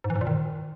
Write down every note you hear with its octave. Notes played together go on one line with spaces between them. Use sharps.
G#2
E3
G#2
A#2
D#3